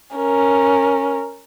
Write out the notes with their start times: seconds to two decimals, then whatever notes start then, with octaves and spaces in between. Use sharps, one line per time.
0.17 C#4 A#4